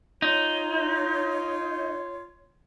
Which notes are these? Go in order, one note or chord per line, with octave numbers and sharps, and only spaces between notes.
D#4 F4 C#5